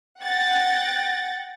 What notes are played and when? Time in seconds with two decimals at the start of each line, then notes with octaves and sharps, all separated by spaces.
0.21 F#5 G5 A6 A#6